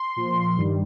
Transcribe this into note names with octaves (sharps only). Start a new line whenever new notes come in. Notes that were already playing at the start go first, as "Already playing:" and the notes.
Already playing: C6
A#2 F3
G2 D#3 G3